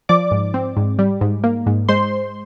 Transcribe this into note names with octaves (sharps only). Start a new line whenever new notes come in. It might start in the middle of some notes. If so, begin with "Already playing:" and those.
F3 D5 D6
G#2
C4
G#2
G3
G#2
A#3
G#2
G#3 C5 C6